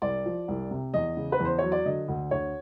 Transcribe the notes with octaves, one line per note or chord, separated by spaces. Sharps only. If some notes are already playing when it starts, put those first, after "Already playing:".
C2 D5
F3
C2
C3
E2 D#5
C#3
B4
E2
C5
F#3 C#5
D5
D3 D#5
D2
D2 C#5